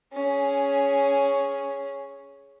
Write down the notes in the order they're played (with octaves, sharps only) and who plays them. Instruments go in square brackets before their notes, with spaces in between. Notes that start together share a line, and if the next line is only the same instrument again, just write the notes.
[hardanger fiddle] C#4 G#4